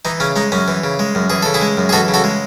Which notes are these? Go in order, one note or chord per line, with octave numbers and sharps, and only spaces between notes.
E3 D#4
C#3 C#4
G#3 D#4
F#2 C#4
E3
C#3
G#3
F#2
E3 G#4
C#3 A4
E4 G#4
G#3
F#2
G#4
E3 F#4 A4
C#3
F#4 A4
G#3